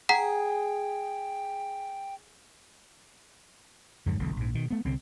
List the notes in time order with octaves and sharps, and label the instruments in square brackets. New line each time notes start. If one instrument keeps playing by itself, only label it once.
[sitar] G#4 [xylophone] F#5 A#5 B6 [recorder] G5
[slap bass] F2 G#2 D3 F#3
E1 B1 E2 D3
A#1 G#2
B2 D#3
A3 B3
C2 D3 C4